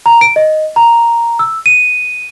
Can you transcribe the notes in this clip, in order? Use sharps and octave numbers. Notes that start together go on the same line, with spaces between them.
A#5
D7
D#5
A#5
E6
D#7